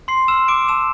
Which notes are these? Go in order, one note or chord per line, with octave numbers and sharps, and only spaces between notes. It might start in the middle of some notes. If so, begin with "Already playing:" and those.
C6 C7
C6 E6 F6 E7
D6 D7
A5 E6 E7